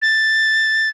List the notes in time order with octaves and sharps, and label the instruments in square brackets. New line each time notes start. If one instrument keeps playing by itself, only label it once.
[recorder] A6